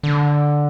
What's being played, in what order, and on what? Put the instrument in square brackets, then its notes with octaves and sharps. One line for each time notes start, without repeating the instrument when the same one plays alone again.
[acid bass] D3